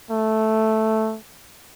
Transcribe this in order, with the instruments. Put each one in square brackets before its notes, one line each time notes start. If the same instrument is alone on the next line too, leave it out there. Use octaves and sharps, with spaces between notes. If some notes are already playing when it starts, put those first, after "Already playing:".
[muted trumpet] A3